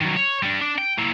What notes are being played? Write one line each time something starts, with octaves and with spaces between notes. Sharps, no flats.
D#3 F#3
C#5
G3 D4
D4
G5
A#3 E4